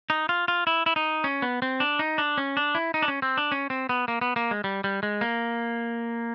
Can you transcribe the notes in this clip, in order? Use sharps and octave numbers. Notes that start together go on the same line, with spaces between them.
D#4
F4
F4
E4
E4
D#4
C#4
B3
C4
D4
D#4
D4
C#4
D4
E4
D#4
D4
C#4
C4
D4
C#4
C4
B3
A#3
B3
A#3
G#3
G3
G3
G#3
A#3